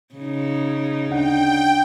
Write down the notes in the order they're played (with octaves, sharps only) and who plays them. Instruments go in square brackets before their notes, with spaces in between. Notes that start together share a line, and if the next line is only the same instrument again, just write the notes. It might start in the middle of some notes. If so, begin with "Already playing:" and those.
[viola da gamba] C#3 D#4
[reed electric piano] D2 D4 F#5 [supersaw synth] G5